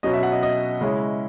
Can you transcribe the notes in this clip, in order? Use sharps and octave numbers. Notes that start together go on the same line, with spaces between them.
B2 F#3 C#4 D#5
E5
F#5
D#5
D#5
C#3 G#3 C#4 E4